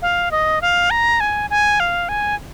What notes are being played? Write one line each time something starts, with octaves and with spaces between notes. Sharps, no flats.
F5
D#5
F5
A#5
G#5
G#5
F5
G#5